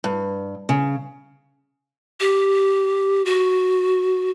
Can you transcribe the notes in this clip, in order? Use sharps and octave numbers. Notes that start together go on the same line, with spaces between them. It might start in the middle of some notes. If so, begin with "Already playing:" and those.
G2
C#3
G4
F#4